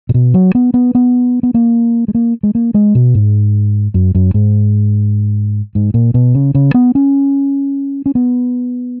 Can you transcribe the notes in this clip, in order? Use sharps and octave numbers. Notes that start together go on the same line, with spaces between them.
A#2
B2
F#3
B3
B3
B3
B3
A#3
G#3
A#3
G#3
A#3
G#3
B2
G#2
F#2
F#2
G#2
G#2
A#2
B2
C#3
C#3
B3
C#4
C#4
B3